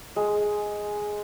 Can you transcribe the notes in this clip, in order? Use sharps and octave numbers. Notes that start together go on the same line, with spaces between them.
G#3